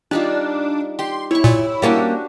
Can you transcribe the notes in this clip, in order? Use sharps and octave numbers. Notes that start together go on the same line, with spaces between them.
G3 D4 D#4 F4
G4 G5 C6
E4 C#5 C#6
A#2
G3 A#3 C#4 D4 F#4 G4